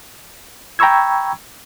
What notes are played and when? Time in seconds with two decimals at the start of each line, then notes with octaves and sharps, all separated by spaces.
0.79 G5 A#5 B5 C#6 E6 G#6